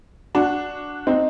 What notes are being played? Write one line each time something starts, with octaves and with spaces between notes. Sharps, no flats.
D4 F#4
C4 D#4